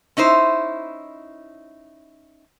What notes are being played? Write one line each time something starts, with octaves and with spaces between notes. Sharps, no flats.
C#4 D#4 E4 C5